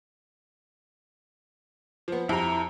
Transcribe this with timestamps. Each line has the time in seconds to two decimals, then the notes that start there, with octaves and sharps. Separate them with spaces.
2.08 F3 B3
2.29 F2 E4 G4 A#5